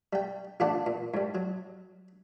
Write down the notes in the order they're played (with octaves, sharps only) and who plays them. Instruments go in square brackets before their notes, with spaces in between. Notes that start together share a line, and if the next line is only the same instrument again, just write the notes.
[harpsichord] G3 G5
A1 D3 F4 A4 D5 F#5
A#2
G#2 G3
F#3